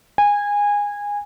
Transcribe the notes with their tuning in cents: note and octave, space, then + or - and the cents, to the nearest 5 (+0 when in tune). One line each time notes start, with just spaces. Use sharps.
G#5 -20